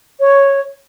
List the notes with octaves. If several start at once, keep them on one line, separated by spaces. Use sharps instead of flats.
C#5